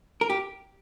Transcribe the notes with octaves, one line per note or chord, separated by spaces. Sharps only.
A#4
G4